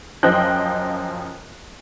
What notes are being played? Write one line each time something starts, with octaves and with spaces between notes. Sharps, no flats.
F#2 F3 C5 D#5 G5 F#6